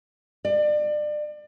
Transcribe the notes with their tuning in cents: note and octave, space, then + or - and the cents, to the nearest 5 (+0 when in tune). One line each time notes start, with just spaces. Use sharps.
D5 +30